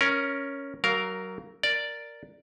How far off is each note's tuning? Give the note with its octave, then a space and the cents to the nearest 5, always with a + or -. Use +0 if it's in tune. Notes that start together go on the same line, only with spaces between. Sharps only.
C#4 +0 A#4 +10
F#3 +25 A#4 +0 F5 +0
A#4 +0 D5 +0